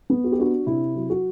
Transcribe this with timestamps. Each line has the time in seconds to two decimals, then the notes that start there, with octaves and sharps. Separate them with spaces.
0.10 B3
0.24 F#4
0.32 G4
0.38 D4 F#4
0.66 C3 E4
0.95 F#3
1.10 F#4